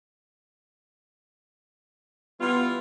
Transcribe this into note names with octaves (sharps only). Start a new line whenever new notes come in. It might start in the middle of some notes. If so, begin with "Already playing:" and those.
E3 G3 B3 F4